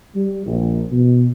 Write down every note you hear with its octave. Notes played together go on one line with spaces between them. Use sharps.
G3
A#1
B2